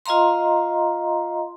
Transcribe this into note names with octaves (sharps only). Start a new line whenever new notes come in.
F4 D#5 F5 A#5 C6